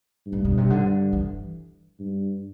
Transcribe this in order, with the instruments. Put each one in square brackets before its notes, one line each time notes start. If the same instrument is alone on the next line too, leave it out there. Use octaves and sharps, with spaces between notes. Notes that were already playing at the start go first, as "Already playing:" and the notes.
[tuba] G2
[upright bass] A2
B2
C3
D3
E3
[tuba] G2